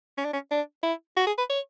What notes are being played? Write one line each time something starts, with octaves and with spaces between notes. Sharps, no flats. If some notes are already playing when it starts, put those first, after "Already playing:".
C#4
D4
C#4
D4
E4
F#4
G#4
B4
C#5